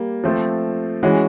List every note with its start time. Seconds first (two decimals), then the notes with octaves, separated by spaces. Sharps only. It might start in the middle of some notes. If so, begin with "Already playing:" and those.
Already playing: G3 A#3
0.24 F3 A3 C4
1.03 E3 G#3 C#4 F#4